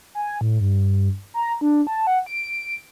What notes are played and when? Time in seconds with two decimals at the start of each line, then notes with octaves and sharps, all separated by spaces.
0.15 G#5
0.41 A2
0.61 G2
1.34 A#5
1.61 D4
1.87 A5
2.07 F#5
2.26 D7